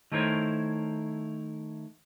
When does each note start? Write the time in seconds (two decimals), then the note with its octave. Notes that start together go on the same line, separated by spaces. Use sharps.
0.12 D#3 A3 E4 A#4 C5 C#5